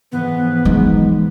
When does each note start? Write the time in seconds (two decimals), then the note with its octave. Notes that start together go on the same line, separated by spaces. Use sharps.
0.12 G#2 E3 F3 B3
0.65 G#3 D#4